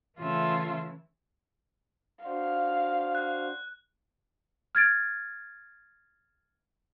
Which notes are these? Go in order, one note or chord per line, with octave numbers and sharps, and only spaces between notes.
C#3 E3 A3 F4 E5
D4 F#4 C5 F5
F#6
F6 G#6 A6 D7